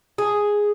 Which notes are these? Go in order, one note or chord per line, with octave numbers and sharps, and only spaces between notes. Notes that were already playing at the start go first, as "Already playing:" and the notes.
G#4